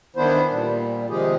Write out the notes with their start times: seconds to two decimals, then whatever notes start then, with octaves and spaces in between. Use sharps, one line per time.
0.16 D#3 E3 B3 D4 E4 C5
0.50 A#2 G3
1.10 C3 D#3 F3 G#3 G4 G#4